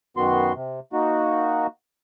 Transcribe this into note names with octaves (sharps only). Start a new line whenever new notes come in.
F#2 D#3 B3 F#4 C6
C3
A#3 D#4 F#4